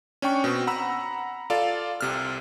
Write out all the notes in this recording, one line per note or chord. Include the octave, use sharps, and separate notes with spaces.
C#4 D4 G5 C#6
B2 C4
F#5 A#5 B5 E6
F4 A4 D5 F5
C2 C3 F6